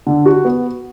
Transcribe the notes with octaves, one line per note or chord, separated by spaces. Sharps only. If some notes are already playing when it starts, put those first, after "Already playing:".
D3
F#4
B3